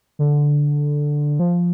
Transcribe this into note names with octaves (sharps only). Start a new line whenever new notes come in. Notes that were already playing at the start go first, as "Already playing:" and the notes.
D3
F3